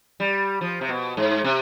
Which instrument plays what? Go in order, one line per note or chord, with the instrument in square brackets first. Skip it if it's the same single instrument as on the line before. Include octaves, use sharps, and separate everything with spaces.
[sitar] G3
F3
C3
B2
G#2
C3